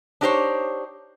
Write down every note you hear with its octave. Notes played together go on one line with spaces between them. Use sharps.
D4 D#4 G4 A#4 C5 C#5